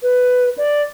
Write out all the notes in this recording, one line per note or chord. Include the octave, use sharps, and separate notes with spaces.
B4
D5